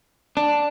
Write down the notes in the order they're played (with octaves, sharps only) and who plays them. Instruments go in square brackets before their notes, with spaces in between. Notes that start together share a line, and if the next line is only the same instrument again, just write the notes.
[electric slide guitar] D4